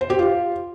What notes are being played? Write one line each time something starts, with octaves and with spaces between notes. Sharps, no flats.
C5
G4
F4